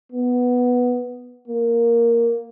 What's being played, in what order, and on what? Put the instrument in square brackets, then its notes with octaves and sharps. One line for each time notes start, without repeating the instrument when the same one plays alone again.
[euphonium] B3
A#3